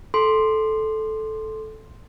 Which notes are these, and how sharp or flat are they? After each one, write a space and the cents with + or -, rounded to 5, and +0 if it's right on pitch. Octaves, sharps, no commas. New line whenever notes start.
A4 -10 C6 +0